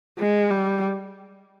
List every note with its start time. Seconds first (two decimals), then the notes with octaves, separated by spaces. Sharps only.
0.19 G#3
0.50 G3